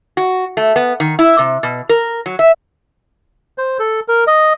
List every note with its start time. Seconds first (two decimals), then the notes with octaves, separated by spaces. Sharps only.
0.17 F#4
0.57 A3
0.76 B3
1.00 D#3
1.19 E4
1.39 C3
1.63 B2
1.89 A#4
2.26 F#3
2.39 E5
3.58 C5
3.79 A4
4.08 A#4
4.27 D#5